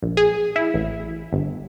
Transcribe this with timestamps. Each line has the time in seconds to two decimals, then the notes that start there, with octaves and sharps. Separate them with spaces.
0.02 A#1
0.17 G#4
0.56 E4
0.74 A1
1.32 G1